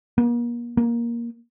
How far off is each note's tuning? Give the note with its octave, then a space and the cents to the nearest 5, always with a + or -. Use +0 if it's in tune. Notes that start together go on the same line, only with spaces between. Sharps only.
A#3 +40
A#3 +10